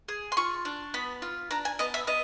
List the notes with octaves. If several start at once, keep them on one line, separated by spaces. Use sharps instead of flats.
G#4
C6
F4 C#6
D4
B3 B5
F4
D4 A#5
G#5
B3 D#5
E5
B3 D#5